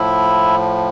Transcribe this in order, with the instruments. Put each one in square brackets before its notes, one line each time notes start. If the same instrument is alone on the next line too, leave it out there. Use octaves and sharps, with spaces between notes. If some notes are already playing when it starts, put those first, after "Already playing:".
Already playing: [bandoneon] A2 F3 E4